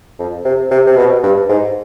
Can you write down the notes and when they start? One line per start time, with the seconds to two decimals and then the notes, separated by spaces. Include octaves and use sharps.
0.19 F2
0.45 C3
0.71 C3
0.87 C3
0.97 B2
1.23 G2
1.49 G#2